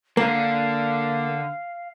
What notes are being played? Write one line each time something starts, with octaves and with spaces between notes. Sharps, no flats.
D3 A#3 F5